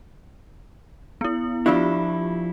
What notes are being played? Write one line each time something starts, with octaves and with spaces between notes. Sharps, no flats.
B3 E4
F3 D4 E4 F4 G4